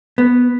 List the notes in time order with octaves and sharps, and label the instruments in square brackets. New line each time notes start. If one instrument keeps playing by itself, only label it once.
[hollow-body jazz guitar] B3